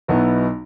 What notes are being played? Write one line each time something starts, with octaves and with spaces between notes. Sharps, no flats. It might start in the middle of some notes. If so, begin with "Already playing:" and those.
B1 B2 F#3 B3 E4